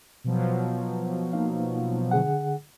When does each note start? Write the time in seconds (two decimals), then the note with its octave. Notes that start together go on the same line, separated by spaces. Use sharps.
0.24 B2 F3 F#3
1.33 A#3 D#4 F5
2.11 D3 G#4 F#5